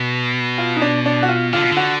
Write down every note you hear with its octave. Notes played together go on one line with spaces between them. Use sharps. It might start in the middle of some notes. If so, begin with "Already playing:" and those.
Already playing: B2
F4
D#4
D4
D4
F#4
F4
D3 F4
B2
D3
F#4